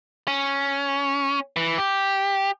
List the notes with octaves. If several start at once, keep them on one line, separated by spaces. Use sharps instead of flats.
C#4
E3
G4